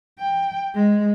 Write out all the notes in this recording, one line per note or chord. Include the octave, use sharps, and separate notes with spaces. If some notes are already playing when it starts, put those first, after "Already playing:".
G5
G#3